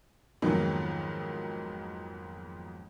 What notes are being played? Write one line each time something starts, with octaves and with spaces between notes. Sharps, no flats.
F2 G#2 D#3 F#3 A#3 B3